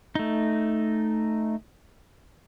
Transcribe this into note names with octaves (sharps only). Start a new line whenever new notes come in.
A3 D#4